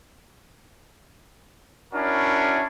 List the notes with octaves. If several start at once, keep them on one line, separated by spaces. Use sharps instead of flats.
C#4 D4 E4 F#4 A#4